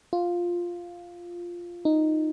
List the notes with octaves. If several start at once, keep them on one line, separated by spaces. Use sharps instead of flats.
F4
D#4